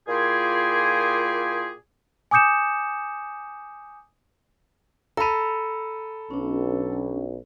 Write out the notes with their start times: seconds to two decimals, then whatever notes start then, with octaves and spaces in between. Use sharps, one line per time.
0.07 A#2 A#3 E4 F4 G4 G#4
2.31 G#5 D6 D#6 G6 C#7 E7
5.17 A4 A#5 B5 D#7
6.31 B1 C#4 D4